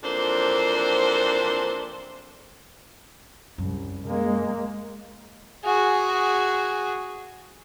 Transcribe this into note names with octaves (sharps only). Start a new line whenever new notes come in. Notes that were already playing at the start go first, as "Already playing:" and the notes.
F2 E3 A#3 C4 D4 C5
C2 F#2
G#3 A#3
F#4 G#4